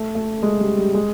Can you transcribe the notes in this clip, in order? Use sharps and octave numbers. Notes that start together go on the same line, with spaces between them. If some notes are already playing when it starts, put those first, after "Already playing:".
Already playing: A3
A3
G#3
G3
G3
G#3